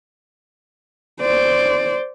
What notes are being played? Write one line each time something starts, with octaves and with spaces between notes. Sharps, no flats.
C5 D5